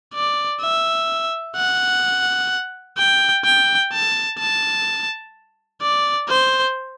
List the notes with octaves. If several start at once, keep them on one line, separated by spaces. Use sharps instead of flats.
D5
E5
F#5
G5
G5
A5
A5
D5
C5